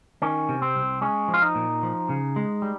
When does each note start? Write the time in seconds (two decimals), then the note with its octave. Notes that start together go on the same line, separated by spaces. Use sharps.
0.22 D#3 C#4
0.49 C3
0.62 C4
0.75 C2
1.01 G#3 C#4
1.28 F3
1.34 F4
1.42 D#4
1.55 A#2
1.83 F3
2.09 C#3
2.36 G#3
2.62 G3